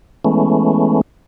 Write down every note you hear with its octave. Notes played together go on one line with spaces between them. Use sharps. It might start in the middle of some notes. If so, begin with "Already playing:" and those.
E3 G#3 A3 B3 C#4